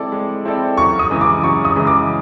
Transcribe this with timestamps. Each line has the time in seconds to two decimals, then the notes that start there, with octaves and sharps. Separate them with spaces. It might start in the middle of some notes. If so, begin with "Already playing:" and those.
Already playing: G#3 C4 E4 A4 D5
0.12 G#3
0.45 C4 E4 A4 D5
0.77 F#2 C#6
0.99 D#6
1.10 C#3 E3 G#3
1.21 D6
1.43 F#2 C#6
1.65 D#6
1.76 C#3 E3 G#3
1.87 D6